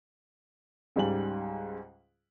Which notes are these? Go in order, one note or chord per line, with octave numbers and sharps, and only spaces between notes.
C#2 G#2 G3 G#5 F#7